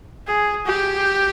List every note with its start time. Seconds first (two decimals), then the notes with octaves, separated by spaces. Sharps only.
0.27 G#4
0.66 G4